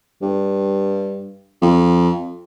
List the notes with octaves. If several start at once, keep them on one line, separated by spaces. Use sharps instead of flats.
G2
F2